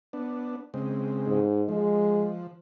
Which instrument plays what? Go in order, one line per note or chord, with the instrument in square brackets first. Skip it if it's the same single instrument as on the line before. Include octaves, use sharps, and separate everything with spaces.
[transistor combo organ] B3 D4
C#3 G#3 C4
[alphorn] G#2
[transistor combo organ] F3 [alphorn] G#3